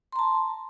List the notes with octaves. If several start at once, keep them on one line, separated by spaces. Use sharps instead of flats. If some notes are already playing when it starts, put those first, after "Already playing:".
A5 A#5 C6